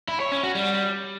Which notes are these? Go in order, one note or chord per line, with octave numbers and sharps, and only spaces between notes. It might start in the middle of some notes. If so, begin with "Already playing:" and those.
E4
C#5
C#4
F#4
G3